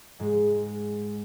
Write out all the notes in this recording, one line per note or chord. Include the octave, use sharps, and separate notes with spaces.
G#2 G#3